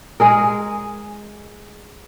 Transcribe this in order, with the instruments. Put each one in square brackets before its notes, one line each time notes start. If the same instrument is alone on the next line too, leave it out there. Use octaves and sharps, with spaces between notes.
[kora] G#3 G#4 A#4